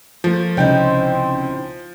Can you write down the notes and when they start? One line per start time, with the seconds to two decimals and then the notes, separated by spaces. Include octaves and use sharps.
0.24 F3 A3 A#3
0.57 C2 C#3 C4 C#4 D#4 E4 C5 G5